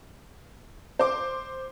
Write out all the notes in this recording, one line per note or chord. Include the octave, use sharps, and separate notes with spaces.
C5 D6